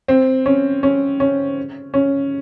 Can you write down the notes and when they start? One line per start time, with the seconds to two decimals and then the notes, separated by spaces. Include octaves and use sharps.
0.08 C4
0.46 C#4
0.83 C#4
1.20 C#4
1.94 C#4